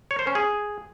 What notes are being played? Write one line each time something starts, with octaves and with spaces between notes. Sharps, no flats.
C#5
C5
C#4
G#4